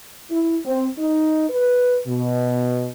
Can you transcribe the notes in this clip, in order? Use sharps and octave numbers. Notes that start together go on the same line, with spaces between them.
E4
C4
D#4
B4
B2